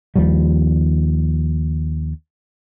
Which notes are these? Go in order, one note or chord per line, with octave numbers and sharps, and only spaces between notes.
D#2 F3 G3